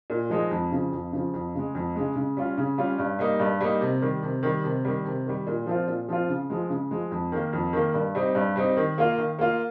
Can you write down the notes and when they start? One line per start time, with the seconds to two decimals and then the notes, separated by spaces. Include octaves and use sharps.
0.10 A#2
0.30 F3 G#3 D#4
0.51 F2
0.71 C#3 F3
0.92 F2
1.12 C#3 F3
1.34 F2
1.55 C#3 G#3
1.75 F2
1.95 C#3 G#3
2.16 C#3
2.37 G3 C#4 F4
2.57 C#3
2.78 G3 C#4 F4
2.98 G2
3.19 G3 A#3 D#4
3.40 G2
3.61 G3 A#3 D#4
3.81 C3
4.02 D#3 G3
4.23 C3
4.43 D#3 G3
4.64 C3
4.85 D#3 G3
5.05 C3
5.26 D#3 G3
5.47 A#2
5.66 F3 C4 F4
5.87 A#2
6.09 F3 C4 F4
6.29 C#3
6.50 F3 G#3
6.70 C#3
6.91 F3 G#3
7.11 F2
7.32 D#3 A#3
7.53 F2
7.73 D#3 A#3
7.94 G2
8.15 G3 C4 D#4
8.35 G2
8.56 G3 C4 D#4
8.77 D#3
8.98 A#3 F4
9.18 D#3
9.39 A#3 F4